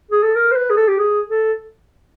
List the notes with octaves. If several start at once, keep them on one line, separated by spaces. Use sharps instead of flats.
G#4
A4
A#4
C5
B4
G#4
A4
G4
G#4
A4